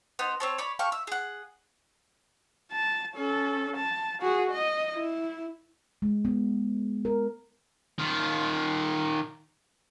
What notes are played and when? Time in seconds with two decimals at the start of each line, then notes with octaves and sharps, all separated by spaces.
0.19 B3 D#4 C5
0.40 C4 C#5 A5
0.58 C#5 D5 B5
0.79 G4 A4 F5 C#6
0.92 E5
1.07 G#4 F#5
2.72 A5
3.15 C#4 A4
3.76 A5
4.22 F#4 G#4
4.51 D#5
4.95 E4
6.02 G#3
6.25 B3
7.05 A#4
7.98 D#3 F4